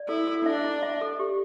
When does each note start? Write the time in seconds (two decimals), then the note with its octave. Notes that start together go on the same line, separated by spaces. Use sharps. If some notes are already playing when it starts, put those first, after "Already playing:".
Already playing: D5
0.09 E4 A4
0.27 A4
0.45 D4 E5
0.64 E4
0.83 E5
1.01 A4
1.19 G4